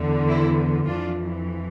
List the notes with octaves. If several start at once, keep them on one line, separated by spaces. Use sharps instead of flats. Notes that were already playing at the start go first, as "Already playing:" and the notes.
Already playing: E2 D3
C4 E4
F2 E3 D4 F4